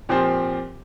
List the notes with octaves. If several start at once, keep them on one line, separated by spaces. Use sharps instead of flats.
A#2 F3 C4 G4 C5